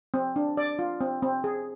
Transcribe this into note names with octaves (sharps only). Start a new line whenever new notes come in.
C4
D4
D5
F4
C4
C4
G#4